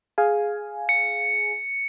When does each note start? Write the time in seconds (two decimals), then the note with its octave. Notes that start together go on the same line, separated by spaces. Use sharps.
0.18 G#4 F5 G#5
0.89 C#7